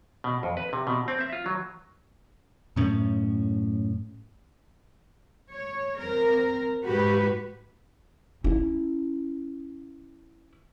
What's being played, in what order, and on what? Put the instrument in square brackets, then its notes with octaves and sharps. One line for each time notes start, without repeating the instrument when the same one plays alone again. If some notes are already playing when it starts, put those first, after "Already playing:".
[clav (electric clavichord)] B2
F2
B4
C3
B2
C4
E5
F4
F#3
[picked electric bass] F#2 A2 C#4
[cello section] C#5
C4 A#4
G#2 F#4 G4 B4
[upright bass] C#4 E4